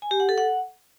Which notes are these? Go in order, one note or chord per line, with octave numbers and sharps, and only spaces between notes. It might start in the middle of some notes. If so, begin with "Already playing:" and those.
G#5
G4
F#5
A4
F#5